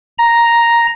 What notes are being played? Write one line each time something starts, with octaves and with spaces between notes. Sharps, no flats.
A#5